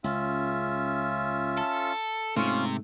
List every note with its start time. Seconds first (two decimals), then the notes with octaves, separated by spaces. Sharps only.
0.04 C#2 C#4 F4 E5
1.58 A4
2.36 G#2 C3 A3 C#4 F4